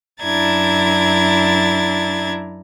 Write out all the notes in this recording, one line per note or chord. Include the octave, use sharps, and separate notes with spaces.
F#2 D4 E4 A#5 G#6 A6